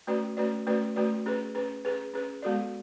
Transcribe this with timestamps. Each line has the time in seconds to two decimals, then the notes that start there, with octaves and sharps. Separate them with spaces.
0.07 A3 C#4 F#4 B4 D5
0.37 A3 C#4 F#4 B4 D5
0.67 A3 C#4 F#4 B4 D5
0.96 A3 C#4 F#4 B4 D5
1.26 C#4 G#4 B4
1.55 C#4 G#4 B4
1.85 C#4 G#4 B4
2.14 C#4 G#4 B4
2.42 G#3 B3 F#4 A4 D5